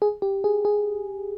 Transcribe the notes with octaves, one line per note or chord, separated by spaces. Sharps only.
G#4
G4
G#4
G#4